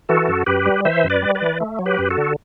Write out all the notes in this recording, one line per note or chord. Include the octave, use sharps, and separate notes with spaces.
E3 F#4 A4
F#2
F#2 G4 B4
G3
E3 C5 E5
F#2
B4 D5
G3
B4 D5
E3
A3
F#3
G4 B4
F#2
F#4 A4
D3